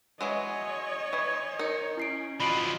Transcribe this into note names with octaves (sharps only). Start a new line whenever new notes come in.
E3 F#3 G#3 C#5 D#5
E3 C#6 G#6
D#4 A#4 C#7
C#4 E4 C7 D7
F3 F#3 D#5 B5 C7 D7